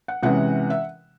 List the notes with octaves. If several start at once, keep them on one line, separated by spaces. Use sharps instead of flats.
F#5
C3 E3 G#3 C#4 F#5
E5